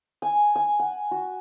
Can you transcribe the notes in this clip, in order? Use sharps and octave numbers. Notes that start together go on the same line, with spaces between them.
G#5
G#5
F#5
F#4